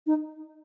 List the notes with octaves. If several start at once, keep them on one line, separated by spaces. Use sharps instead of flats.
D#4